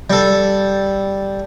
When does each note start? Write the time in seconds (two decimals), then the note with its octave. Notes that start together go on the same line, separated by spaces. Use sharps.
0.10 G3 A4